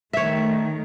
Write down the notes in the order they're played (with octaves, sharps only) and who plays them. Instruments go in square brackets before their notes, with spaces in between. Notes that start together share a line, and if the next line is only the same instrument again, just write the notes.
[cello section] D#3 A3 [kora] C#5 E5